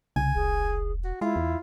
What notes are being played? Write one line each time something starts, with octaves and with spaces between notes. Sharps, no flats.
C2 C#3 G#5
E1 G#4
F#4
G#3 E4 F4
E2